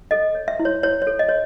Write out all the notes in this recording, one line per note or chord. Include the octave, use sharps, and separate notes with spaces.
A4 D#5
C#5
E5
E4
C#5
E4 C#5
C#5
A4
D#5
C#5